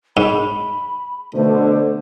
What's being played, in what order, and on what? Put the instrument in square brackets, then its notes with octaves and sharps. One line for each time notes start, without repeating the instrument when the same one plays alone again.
[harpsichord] G#2 [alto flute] B5
[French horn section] B2 D3 A3 [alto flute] C5